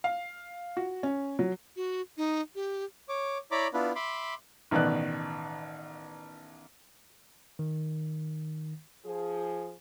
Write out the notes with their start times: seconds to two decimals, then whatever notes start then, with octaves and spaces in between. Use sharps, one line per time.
0.04 F5
0.77 F#4
1.03 C#4
1.39 F#3
1.76 F#4
2.17 D#4
2.55 G4
3.09 C#5 D6
3.51 E4 C#5 D5 A#5 B5 D6
3.74 B3 D4 E4 F4 B4
3.95 E5 B5 C6 D6
4.71 A1 B2 D#3 D5 F#6
7.59 D#3
9.05 F3 G#4